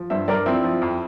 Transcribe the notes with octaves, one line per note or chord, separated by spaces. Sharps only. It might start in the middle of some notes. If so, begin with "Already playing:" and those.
Already playing: F3
G2 C5 E5
G2 A#4 D5
F3 C4 E4
F3
F2